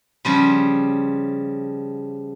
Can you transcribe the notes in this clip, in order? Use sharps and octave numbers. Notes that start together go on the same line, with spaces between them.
C#3 F3 G3